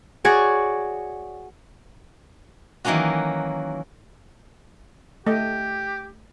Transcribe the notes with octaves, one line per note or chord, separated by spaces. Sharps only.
F#4 G#4 C#5 D5
D#3 E3 F#3 A#3 C#4 F#4
A3 G4 D#5